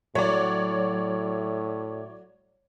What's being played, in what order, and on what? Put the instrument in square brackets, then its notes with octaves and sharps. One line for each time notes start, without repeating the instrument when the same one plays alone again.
[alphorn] A2 [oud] F#3 [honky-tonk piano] C#5 D5